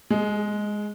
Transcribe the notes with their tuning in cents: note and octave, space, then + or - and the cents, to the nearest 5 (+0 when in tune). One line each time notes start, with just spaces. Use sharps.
G#3 +0 G#4 +30